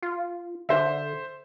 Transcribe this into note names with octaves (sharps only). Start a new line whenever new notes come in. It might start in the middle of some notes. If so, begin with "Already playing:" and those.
F4
D3 C5 E5